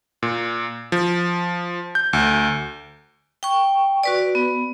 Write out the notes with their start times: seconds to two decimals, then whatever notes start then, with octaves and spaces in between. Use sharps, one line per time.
0.23 A#2
0.92 F3
1.95 G6
2.13 D2
3.43 G5 C#6
4.03 F#4 B4 D5
4.35 B3